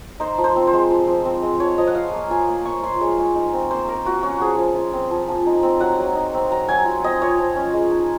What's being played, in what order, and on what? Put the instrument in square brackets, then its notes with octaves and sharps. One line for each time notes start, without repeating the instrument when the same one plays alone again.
[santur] D#4 C5
F3
C5
C4
C5
G#3
F3
F3
C4
G#3
F3 C#5
F3 D#5
F#5
F4 F5
A#3
F4 G#5
A#3
A#3 C#6
F4 C6
G#3 C#5
G#3
D#4
C4
A#3 C5
A#3 A#4
F4 F#4
C#4 F#4
F3 G#4
F3
F4
C4
F3
F3
D#4
C4
F#3 F#5
F#3
D#4
C4
F#3 A#5
F#3 G#5
F4
C4 D#5
F4 C#5
F3
C#4
G#3
D#4